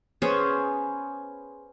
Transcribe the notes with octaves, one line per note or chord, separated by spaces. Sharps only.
B3 C#4 G#4 C5